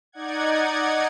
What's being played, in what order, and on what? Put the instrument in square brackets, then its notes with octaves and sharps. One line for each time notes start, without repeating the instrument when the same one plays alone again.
[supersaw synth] D#4 D5 F#5 G#6